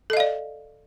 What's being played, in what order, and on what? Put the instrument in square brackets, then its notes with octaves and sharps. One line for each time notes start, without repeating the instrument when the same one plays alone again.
[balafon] A4
D#5
F5
D5